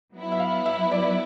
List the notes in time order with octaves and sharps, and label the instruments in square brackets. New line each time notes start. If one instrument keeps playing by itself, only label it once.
[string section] F#3 B3 E4
[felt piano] E5
F5
E5
D5